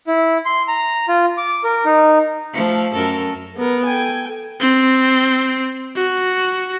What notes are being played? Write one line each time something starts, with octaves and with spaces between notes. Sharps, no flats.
E4
C6
A#5
F4
D6
A#4
D#4
F3 A3
F#2 A4 A#4
B3 A#4
A4 G5 G#5
C4
F#4